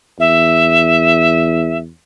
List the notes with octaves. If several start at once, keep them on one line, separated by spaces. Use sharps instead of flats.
E2 E5